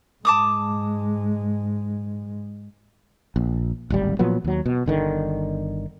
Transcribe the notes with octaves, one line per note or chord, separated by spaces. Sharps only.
G#2 G#3 A5 D6 D#6
A#1
D1 G#1 G3
A#2 F3 F#3 B3
D#2 F#3
B2
G1 D3 D#3